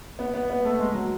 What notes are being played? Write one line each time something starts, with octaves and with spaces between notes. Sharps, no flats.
B3
B3
B3
A3
G#3
F#3